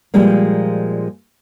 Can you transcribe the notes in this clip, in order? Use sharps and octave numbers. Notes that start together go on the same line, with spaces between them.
A#2 F3 G3 G#3 A#3